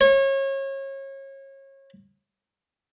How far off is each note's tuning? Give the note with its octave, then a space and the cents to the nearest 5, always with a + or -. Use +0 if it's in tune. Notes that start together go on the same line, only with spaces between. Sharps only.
C#5 -30